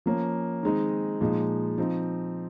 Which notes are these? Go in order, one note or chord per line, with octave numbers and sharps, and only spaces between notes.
F3 A#3 C#4
D#3 G#3 C4 D#4
A#2 F3 G#3 D#4
F3 C4 D#4